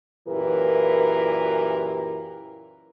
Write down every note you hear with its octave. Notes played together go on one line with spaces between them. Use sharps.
F#2 A#2 E3 G4 A#4 B4